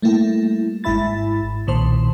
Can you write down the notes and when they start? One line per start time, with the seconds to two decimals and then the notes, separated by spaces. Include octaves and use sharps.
0.02 G3 A3 A#3 E4
0.84 G#1 G#2 E4 E5 B5 A6
1.67 B1 A#2 D#3 C5 A5 C6